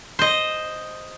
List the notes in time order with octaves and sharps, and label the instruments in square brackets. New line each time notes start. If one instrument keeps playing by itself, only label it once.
[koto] C5 D#5